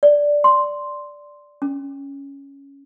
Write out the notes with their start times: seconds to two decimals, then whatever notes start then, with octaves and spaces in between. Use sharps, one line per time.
0.03 D5
0.44 C6
1.62 C#4